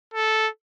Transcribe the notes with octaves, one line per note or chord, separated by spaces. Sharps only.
A4